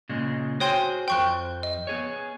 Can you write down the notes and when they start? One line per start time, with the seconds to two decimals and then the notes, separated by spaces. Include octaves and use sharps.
0.09 A#2 C#3 G#3
0.60 F#4 G#4 C5 C#5 G5 C6
1.08 F2 C5 G5 C#6 F#6
1.63 D#5
1.87 B3 G#4 C#5